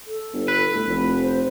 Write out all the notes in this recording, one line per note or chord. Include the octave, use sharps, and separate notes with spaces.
A4
G1
B4
A2
F1
C5